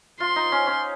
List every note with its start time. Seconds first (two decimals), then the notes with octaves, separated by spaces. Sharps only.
0.20 F4 C6
0.36 D#4
0.52 C#4
0.67 C#4